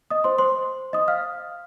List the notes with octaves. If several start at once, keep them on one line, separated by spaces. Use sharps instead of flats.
D#5 D#6
C5 C6
C5 C6
D#5 D#6
F5 F6